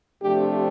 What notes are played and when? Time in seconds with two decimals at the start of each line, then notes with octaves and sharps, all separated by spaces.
0.22 C3 F3 A3 D4 G4